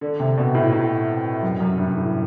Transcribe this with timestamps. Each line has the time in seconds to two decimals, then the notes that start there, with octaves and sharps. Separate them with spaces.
0.01 D3
0.20 C3
0.37 B2
0.54 A2
0.72 A2
1.42 F#2
1.60 F#2
1.78 G2
1.95 A2